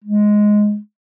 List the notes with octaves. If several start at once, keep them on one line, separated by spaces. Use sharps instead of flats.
G#3